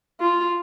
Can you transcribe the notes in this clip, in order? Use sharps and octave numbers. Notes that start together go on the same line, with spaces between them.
F4